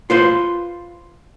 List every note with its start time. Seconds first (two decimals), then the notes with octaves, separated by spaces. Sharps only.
0.10 F4 B4 C5